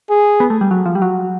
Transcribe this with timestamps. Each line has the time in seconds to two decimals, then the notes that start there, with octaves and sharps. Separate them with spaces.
0.10 G#4
0.40 B3
0.50 A3
0.61 G3
0.71 F#3
0.86 F3
0.95 G3
1.02 F#3